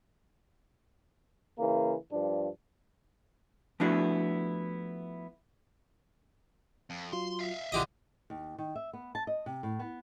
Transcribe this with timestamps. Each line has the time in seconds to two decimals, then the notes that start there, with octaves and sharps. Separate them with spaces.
1.59 C#3 E3 A#3
2.10 G2 F3 D4
3.80 F3 A3 B3 D4 E4 F#4
6.90 F2
7.13 F#3 F4 C6
7.40 E5 F5
7.72 B1 D3 E3 F3 G4 D#5
8.30 D#2
8.58 D#3
8.75 E5
8.93 B3
9.15 A5
9.27 D#5
9.46 C3
9.63 A2
9.79 B3